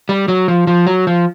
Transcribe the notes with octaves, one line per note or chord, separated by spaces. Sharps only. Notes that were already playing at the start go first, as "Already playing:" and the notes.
G3
F#3
F3
F3
F#3
F3